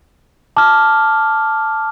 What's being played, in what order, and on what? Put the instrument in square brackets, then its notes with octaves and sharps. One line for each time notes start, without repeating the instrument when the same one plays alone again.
[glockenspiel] A5 D6 F6